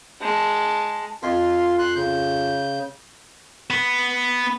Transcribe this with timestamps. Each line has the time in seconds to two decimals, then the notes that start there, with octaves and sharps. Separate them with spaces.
0.21 G#3 A5
1.23 F2 F4 C6
1.79 C6 F#6
1.96 C#3 G6
3.70 B3